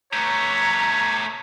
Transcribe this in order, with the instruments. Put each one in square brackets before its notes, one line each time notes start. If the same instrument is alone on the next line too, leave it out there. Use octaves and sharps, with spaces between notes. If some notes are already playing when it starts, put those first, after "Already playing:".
[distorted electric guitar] A3 G4 [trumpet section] B4 C#5 [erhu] A#5